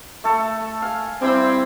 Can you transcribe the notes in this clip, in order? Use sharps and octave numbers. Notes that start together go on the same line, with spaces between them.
A3 A4
F5 G#5
G3 C4 E4